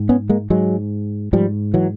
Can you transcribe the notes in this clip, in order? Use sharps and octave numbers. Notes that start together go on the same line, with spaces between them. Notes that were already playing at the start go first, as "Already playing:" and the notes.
Already playing: G#2
B3 C#4
G#3 A#3
G#2 F#3 G#3
G#2 F3 G3
E3 F#3